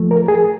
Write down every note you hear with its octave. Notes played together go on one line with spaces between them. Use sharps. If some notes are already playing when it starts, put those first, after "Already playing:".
Already playing: F3 A3
A#4
G#4